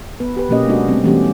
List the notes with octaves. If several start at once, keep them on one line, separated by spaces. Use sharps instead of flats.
B3 B4
G4 B4
B2 F#3 A#3 C#4 G4 D#5
G#3 B3 D4 F#4 A4 D#5
F#3 G3 A3 C4
E3 G3 A3 B3 C#4 G4